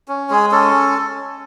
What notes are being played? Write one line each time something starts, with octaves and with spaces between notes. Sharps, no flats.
C#4
G#3 G#4
C#4 A4